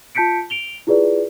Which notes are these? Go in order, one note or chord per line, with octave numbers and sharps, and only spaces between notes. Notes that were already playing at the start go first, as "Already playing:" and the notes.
F4 A5 G6 B6 C#7 D7
D7 F7 G7
E4 F4 G#4 B4 D5